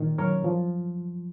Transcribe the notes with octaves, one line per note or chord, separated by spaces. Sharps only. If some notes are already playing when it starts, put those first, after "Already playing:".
Already playing: A#2 D#3
F#2 A#4 C#5
F3